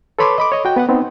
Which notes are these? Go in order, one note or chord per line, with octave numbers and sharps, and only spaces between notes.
A4 B4 C#5 B5 C6 D6
D#5 B5 D6
C#5 D#5
F#4 G5
B3 B4 F#5
B3 C4 D#4